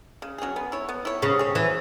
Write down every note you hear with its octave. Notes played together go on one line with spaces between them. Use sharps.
C#3
F#3 C#4 G#4
B3
E4 C#5
B3
E4 C#5
C#3 B3
G#4 C#5
E3 F#3